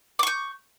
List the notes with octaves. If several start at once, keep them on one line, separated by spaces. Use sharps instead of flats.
C#6 D6 G6